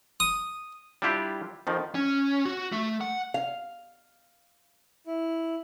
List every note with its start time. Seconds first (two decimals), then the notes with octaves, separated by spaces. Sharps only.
0.20 D#6
1.02 G3 D4 E4 F4 G4
1.67 F2 D#3 F3
1.95 C#4
2.45 F#4
2.72 A3
3.01 F#5
3.34 F5
5.07 E4